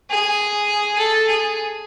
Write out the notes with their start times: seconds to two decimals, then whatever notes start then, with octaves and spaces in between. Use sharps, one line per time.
0.10 G#4
0.98 A4
1.27 G#4